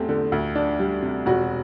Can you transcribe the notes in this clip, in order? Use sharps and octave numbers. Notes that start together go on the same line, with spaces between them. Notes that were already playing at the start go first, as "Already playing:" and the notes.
Already playing: E2 A3 C4 G4
D3
D2
D4
G3
C3
E1 F#4